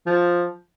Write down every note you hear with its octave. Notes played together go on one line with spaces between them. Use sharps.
F3